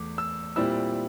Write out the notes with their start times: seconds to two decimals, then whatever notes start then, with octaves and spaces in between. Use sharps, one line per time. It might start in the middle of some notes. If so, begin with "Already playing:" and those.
Already playing: E2 A3 D6
0.18 E6
0.56 A#2 G3 C4 E4 E6